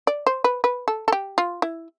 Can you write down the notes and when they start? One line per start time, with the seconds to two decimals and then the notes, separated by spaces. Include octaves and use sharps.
0.07 D5
0.27 C5
0.44 B4
0.64 B4
0.88 A4
1.08 A4
1.12 G4
1.38 F4
1.62 E4